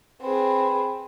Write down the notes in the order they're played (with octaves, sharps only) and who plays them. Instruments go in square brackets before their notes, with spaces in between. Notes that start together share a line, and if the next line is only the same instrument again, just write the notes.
[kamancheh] C4 G#4 [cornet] B4